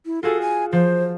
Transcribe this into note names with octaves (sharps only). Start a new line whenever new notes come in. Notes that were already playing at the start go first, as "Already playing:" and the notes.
E4
F4 F#4 G#4 A4
G#5
F3 C5